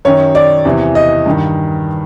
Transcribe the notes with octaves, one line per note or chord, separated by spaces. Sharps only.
F#2 D#3 C#5
D5
E2 C3 E3
D#5
G2 D#3